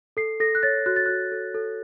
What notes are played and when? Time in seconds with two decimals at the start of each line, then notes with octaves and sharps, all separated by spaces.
0.17 A4 C7
0.40 A4 A#6
0.55 F#6
0.63 C#5 A6
0.86 F#4 F#6
0.96 A6
1.06 F#4 F#6
1.32 A4
1.54 A4